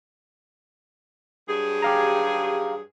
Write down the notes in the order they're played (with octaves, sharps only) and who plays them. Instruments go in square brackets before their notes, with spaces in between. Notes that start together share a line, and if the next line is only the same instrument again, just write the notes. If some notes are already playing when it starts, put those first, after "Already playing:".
[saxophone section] G2 F#3 G#4
[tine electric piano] G4 F5 A#5